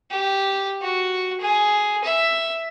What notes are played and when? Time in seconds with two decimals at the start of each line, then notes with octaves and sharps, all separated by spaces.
0.11 G4
0.82 F#4
1.41 G#4
2.05 E5